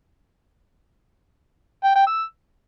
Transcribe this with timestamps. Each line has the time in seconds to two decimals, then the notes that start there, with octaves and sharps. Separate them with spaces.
1.84 G5
1.95 G5
2.07 E6